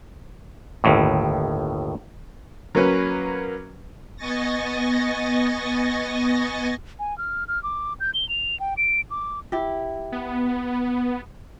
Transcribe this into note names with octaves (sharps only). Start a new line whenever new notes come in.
G1 D#2 A2
F#3 A#3 C#4 B4
B3 D#5 G#5 C#6 A6 A#6
G#5
F6
F6
D6
G6
G7
F7
G5
D7
D6
E4 G4
B3